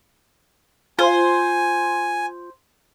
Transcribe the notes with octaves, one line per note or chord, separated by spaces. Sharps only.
F4 C5 G#5